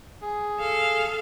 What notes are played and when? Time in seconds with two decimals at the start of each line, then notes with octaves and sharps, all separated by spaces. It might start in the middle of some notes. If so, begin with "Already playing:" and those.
0.22 G#4
0.59 A4 F5